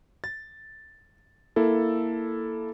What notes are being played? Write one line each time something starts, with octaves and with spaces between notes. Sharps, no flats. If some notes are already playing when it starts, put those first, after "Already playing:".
A6
A#3 E4 A4